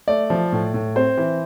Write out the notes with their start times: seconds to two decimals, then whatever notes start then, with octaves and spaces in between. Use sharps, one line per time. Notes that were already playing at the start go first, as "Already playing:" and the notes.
0.08 A3 D5
0.30 F3
0.52 A2
0.74 A2
0.96 C4 C5
1.18 E3